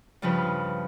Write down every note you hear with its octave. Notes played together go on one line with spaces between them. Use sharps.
G2 C#3 F3 B4